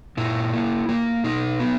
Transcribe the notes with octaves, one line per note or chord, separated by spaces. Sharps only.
A#2 E4
A#3
A#3
B2 D#4
B3